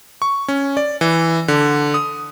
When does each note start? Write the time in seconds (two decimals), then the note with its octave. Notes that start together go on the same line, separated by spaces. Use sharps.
0.22 C#6
0.48 C#4
0.77 D5
1.01 E3
1.48 D3
1.94 D#6